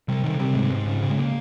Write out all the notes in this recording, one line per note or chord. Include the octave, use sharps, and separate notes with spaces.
C3 G3
C3 D#3
C3 G3
G#2 G#3
G#2
C#3
C#3
G#3
A#3